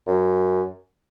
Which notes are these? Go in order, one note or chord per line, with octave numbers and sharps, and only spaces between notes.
F#2